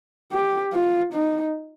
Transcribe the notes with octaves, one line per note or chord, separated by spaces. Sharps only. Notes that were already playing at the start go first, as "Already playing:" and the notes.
G4
F4
D#4